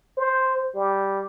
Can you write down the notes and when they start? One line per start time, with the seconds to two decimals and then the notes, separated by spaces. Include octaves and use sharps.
0.17 C5
0.75 G3